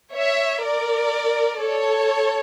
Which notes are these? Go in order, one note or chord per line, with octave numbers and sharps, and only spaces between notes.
C#5 E5
A#4 D5
A4 C#5